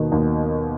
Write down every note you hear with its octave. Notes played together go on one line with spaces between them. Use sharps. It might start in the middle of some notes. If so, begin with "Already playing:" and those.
Already playing: D#2 B2 D#3 A#3
D#2